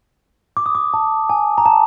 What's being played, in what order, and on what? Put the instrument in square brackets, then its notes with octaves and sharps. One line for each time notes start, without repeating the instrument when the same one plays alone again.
[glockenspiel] D6
D#6
D6
A5
G#5
A#5
A5